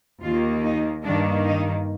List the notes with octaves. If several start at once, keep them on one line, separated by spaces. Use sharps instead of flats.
D#2 D#3 A#3 F4
D#4
G2 D#3 A#3 D4
D#4